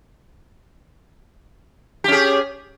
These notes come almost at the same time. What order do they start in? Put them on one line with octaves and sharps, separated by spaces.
G4 C#4 G#4